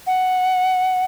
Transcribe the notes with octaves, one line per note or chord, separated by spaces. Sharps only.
F#5